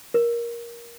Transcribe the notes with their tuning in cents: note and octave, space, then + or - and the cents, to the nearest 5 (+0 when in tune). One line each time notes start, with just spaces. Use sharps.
A#4 +15